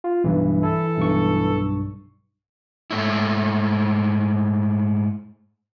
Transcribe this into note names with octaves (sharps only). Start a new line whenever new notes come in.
F4
B1 G2 E3
E4 A4
B1 G2 C#6
G#2 A3 E4